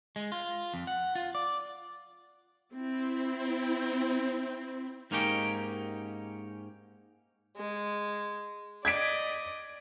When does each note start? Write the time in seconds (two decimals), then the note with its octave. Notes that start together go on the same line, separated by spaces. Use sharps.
0.16 G#3
0.32 F4
0.74 F2
0.87 F#5
1.15 F4
1.35 D5
2.74 C4 E4
5.11 G#2 A#3 C#4 D#4 G4 G5
7.57 G#3
8.85 D5 D#5 G#6 B6 D7